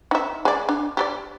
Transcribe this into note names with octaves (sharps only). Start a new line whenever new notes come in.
D#4 E5
G#3 D5
D4
G4 A4 D5